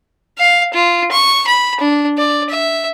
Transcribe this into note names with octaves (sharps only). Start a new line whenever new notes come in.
F5
F4
C#6
B5
D4
D5
E5